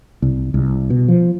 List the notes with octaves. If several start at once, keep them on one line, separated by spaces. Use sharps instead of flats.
C2
C2
B2
F3